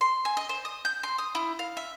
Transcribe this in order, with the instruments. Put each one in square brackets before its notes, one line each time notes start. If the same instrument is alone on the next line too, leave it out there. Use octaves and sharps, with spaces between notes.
[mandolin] C6
G#5
D#5
C5
D#6
G6
C6
D#6
E4
F5
E5